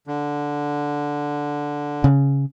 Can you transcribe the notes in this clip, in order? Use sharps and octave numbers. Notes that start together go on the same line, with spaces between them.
D3
C#3